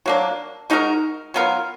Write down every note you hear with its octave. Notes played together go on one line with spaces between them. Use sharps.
F#3 A#3 D4
G#3 D#4 F#4 A#4
F#3 B3 F4 A#4